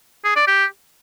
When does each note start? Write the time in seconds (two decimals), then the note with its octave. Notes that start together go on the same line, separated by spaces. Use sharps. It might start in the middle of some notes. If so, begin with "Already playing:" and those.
0.24 G#4
0.36 D5
0.47 G4